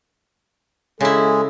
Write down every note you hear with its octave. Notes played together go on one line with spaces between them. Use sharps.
C#3 G#3 E4 A4